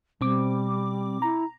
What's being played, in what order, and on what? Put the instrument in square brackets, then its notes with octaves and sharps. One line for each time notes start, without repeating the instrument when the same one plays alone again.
[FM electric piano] B2 C4 D6 [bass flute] G3
[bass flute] E4 [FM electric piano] A#5